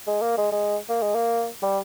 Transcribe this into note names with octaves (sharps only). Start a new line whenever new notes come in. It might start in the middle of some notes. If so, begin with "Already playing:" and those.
G#3
A#3
G#3
G#3
A#3
G#3
A#3
G3